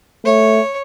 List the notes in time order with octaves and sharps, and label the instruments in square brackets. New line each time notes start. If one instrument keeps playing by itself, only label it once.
[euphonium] A3 [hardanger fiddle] C#5